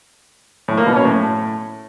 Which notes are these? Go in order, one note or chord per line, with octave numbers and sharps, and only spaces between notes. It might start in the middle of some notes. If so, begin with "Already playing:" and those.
A2
A#3
B2
C#4
A2